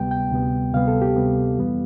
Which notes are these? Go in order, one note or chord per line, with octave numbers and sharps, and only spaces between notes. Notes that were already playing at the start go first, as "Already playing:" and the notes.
Already playing: D2 C3 G3 B3 G5
G5
D2 C3 G3 B3
D2 C3 G3 B3 F5
A4
G4
D2 C3 G3 B3
F2 E3 G3 B3